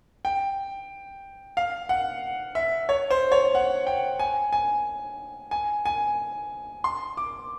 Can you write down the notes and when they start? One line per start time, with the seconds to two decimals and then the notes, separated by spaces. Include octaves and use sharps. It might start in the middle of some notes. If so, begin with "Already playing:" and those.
0.25 G5
1.57 F5
1.89 F#5
2.55 E5
2.89 C#5
3.11 C5
3.32 C#5
3.55 F#5
3.87 G5
4.19 G#5
4.53 G#5
5.51 G#5
5.86 G#5
6.84 C6
7.17 D6